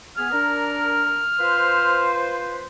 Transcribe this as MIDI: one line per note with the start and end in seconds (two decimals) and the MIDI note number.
0.17 0.31 59
0.17 0.31 68
0.17 2.07 89
0.32 1.23 62
0.32 1.23 70
1.39 2.66 65
1.39 2.66 71
1.39 2.66 72